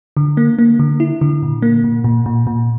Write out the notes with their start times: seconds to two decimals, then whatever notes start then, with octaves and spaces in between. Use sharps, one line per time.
0.17 D3
0.37 A#3
0.59 A#3
0.79 D3
1.00 E4
1.21 D3
1.43 A#2
1.62 A#3
1.84 A#2
2.04 A#2
2.26 A#2
2.47 A#2